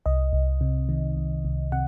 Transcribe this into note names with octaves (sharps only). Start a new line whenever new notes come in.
C2 D#5
C2
C3
D#3
C2
C2
C3 F#5